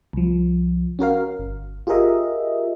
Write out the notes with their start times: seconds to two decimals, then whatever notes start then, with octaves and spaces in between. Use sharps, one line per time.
0.13 C2 F3
0.99 C#4 F#4 A#4 F5
1.39 G1
1.87 F4 G4 G#4 A#4 D#5 E5